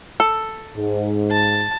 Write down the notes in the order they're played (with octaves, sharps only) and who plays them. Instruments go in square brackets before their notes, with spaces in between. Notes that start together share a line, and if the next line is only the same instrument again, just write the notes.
[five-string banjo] A4
[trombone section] G#2
[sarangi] A5